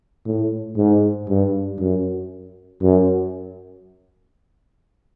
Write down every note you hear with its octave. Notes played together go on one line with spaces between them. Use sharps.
A2
G#2
G2
F#2
F#2